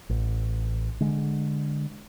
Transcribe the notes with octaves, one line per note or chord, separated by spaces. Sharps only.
A1
D3 G#3